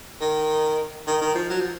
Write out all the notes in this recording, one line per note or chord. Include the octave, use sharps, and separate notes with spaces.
D#3
D#3
D#3
F3
F#3
F3